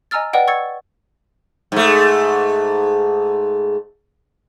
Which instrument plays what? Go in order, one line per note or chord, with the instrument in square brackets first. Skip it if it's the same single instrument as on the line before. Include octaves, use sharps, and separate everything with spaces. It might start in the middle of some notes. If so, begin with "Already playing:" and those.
[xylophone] D#5 G#5 A#5 E6 F6 A6
B4 D5 D#5 F#5 G5
C#6 E6 G#6 A6 C#7
[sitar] G#2 A3